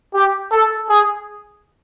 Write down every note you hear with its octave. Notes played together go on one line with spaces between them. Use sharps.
G4
A4
G#4